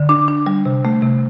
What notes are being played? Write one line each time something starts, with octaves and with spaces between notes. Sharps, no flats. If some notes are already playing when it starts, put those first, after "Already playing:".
Already playing: D3
D4
D4
G3
C3
A3
C3